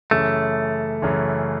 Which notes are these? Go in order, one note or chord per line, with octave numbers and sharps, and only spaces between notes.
F#2 C#3 E3 A3
F#2 C#3 E3